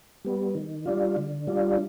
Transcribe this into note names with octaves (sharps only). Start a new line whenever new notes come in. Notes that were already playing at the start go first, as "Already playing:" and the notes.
G3 B3
D#3
G3 D4 F4
D3
G3 D4 F4